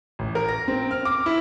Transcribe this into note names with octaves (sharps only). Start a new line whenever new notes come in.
A1
A#4
A#6
C4
F6
D6
E4